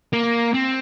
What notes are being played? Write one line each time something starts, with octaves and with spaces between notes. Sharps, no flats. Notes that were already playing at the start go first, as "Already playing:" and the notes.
A#3
C4